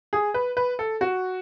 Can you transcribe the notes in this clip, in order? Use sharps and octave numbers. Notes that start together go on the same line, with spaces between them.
G#4
B4
B4
A4
F#4